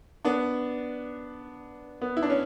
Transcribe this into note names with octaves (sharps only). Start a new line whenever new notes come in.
B3 D4
B3
E4
D4
C#4